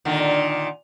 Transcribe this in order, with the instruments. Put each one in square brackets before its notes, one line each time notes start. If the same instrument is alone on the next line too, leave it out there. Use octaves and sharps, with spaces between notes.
[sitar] A#2 D3 D#3